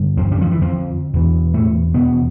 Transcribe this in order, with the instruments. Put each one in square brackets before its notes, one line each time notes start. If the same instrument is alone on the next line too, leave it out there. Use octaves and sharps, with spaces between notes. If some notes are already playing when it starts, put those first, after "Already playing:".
Already playing: [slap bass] G2 D3
F2 F3
G2 G3
F2 F3
E3
F2 F3
E2 B2
A2 A3
B2 B3